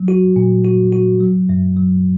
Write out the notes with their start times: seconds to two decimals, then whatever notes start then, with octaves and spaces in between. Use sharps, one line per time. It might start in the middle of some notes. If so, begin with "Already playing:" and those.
Already playing: F#3
0.08 F#4
0.36 A#2
0.65 F#4
0.93 F#4
1.20 F#3
1.49 F#2
1.77 F#3